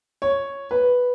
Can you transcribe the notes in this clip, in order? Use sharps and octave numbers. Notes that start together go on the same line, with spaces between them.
C#5
B4